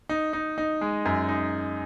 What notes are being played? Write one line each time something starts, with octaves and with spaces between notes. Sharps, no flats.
D#4
D#4
D#4
G#3
F#2
D#4